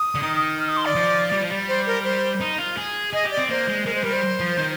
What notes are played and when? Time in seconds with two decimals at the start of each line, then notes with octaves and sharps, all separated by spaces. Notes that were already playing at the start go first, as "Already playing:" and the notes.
Already playing: D#6
0.15 D3
0.23 D#3
0.59 F6
0.69 D#6
0.77 C6
0.86 D5
0.95 F3
1.32 G3
1.41 F3
1.50 G3
1.68 C5
1.86 A#4
2.04 C5
2.41 D#4
2.58 F4
2.77 G#4
3.13 G#4 D#5
3.25 G4
3.31 D5
3.38 C4
3.49 A#3 C5
3.68 G#3
3.85 G#3 A#4
3.95 C5
4.04 G3 A#4
4.13 C5
4.40 F3
4.58 D#3